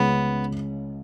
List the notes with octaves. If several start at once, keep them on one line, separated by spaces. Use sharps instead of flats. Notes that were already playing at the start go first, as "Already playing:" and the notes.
Already playing: C#2 C#3 G#3 B3 C#4